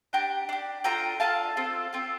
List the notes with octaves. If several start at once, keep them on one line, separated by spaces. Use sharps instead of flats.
D4 G4 G5 A#5
D4 G4
D4 F4 A4 G5 A#5
D4 F4 A4 F5 A5
C4 F4 A4
C4 F4 A4